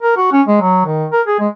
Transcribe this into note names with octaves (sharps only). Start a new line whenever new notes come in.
A#4
F#4
C#4
G#3
F#3
D#3
A#4
G#4
G#3